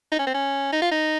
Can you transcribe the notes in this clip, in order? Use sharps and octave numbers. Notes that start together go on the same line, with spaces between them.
D#4
C#4
C4
C#4
D#4
F4
D#4